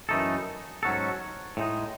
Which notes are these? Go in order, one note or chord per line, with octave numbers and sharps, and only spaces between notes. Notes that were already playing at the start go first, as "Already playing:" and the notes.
F#2 E3 A3 D#4 A4
G#2 F#3 C#4 F#4 A4
A2 G#3 D#4